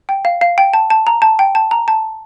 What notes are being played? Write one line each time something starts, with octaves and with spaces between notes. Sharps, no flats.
G5
F5
F5
G5
A5
A5
A#5
A5
G5
A5
A#5
A5